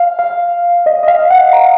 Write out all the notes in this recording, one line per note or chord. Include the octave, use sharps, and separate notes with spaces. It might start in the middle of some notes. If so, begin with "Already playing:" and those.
Already playing: F5
F5
D#5
D#5
F5
F#5
A#5